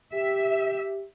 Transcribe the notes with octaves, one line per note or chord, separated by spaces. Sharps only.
G4 E5